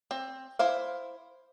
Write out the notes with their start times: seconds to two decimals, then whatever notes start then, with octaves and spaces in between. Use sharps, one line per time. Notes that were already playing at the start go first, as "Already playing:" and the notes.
0.11 C4
0.59 E4 C5 F5